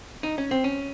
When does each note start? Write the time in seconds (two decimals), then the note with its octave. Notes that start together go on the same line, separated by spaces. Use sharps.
0.23 D#4
0.38 C#4
0.51 C4
0.64 C#4